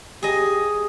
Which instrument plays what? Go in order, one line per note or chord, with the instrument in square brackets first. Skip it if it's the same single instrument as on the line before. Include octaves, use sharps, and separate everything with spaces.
[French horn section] G4 [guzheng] G#4 D#5